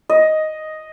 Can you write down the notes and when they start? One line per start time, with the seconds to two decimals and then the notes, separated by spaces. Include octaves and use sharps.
0.09 D#5